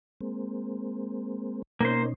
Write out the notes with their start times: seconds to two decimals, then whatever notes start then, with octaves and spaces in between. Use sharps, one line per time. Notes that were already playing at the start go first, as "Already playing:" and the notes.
0.21 G#3 A#3 C4
1.81 B2 A#3 C#4 D#4 C5